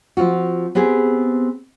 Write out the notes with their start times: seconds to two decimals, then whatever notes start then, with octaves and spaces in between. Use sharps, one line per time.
0.17 F3 C4 F4 F#4
0.75 B3 C4 G4 G#4